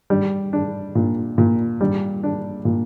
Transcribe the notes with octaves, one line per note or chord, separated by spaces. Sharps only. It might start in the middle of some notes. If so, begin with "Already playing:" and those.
G3
D4
A#2
A#2
G3
D4
A#2